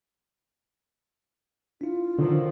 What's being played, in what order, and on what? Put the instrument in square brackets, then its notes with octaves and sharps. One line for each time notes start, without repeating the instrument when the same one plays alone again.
[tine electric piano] D4 E4 [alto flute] F4
[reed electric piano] D3 [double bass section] D#3 F3 F#3